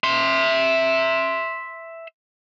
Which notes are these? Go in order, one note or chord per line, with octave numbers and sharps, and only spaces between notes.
E5 C6